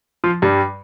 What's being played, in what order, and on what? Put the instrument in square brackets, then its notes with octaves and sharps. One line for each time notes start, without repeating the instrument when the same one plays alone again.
[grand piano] F3 F4
G2 G3